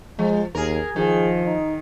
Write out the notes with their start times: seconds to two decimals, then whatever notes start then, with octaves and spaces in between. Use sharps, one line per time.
0.19 F3 G#3
0.55 D#2 G#4 A#4
0.96 D#3 F3 G#4
1.45 D#4